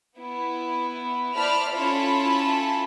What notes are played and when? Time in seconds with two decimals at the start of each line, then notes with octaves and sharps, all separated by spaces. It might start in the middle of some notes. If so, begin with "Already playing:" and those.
0.17 B3 E4
1.34 C5 D5 E5 A5 B5 F6
1.71 C#4 E4 F4 A4 A5 B5